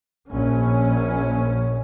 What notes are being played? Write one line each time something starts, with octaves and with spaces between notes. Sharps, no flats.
A#1 A#2 C#4